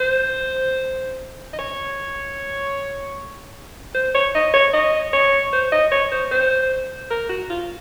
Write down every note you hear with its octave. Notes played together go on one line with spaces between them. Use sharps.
C5
D#5
C#5
C5
C#5
D#5
C#5
D#5
C#5
C5
D#5
C#5
C5
C5
A#4
F#4
F4